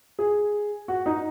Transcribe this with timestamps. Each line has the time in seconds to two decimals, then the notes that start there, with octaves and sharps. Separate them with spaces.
0.19 G#4
0.88 F#4
1.06 D#4